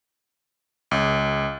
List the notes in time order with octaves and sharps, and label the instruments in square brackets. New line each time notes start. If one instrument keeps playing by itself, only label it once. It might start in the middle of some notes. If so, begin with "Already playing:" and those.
[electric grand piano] C#2